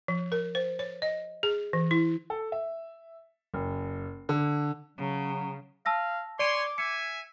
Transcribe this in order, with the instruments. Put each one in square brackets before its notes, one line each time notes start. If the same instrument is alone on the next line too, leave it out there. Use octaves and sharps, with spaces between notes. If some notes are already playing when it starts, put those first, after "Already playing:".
[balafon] F3
A#4
C5
C#5
D#5
G#4
E3
E4
[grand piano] A4
E5
F#1
D3
[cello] C#3 [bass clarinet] F#3
[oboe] F5 [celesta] A5 E6 A#6
[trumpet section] C#5 G#5 C6 [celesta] D5 D7 D#7 [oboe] D6
[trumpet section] E5 G#5 [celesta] C#7